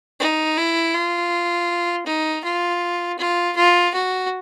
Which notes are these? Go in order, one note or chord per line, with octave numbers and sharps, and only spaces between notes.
D#4
E4
F4
D#4
F4
F4
F4
F#4